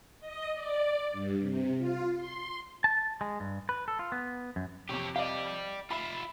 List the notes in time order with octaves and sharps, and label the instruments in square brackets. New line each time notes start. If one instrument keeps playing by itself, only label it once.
[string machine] D#5
D5
G2
C3
F4
C6
[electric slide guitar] A5
G#3
G2
B4
A4
F4
B3
F#2
[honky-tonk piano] F2 C3 [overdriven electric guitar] G4 C#5
[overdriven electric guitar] G4 D5 [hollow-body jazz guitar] D#5 F5
[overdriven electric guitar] F4 E5 [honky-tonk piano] B5